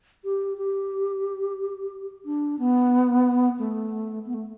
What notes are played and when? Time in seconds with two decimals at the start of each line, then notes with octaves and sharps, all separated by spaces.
0.24 G4
0.58 G4
2.25 D4
2.59 B3
3.59 A3
4.26 B3
4.34 A3